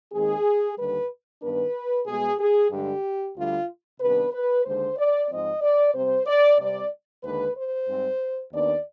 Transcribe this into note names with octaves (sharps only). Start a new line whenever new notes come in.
D#2 D#3 G#3 C4 G#4
D#2 D3 G3 B4
G2 D#3 B3 D4 B4
B2 G#3 B3 G#4
G#4
G2 D3 G#3 G4
D2 D3 G3 F4
C3 D#3 G3 B3 D4 B4
B4
D#2 D3 G#3 C5
D5
G#2 F3 C4 D#5
D5
C3 G3 C4 C5
D5
C3 G3 C4 D5
D#2 D3 G#3 B4
C5
G#2 G3 C4
D#2 D#3 B3 D4 D5